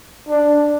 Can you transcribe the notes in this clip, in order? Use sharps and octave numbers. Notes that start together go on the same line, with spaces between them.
D4